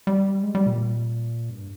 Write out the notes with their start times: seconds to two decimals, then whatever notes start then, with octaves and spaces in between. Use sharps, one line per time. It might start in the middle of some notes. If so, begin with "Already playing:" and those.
0.07 G3
0.43 G#3
0.55 G3
0.66 A#2
1.50 G2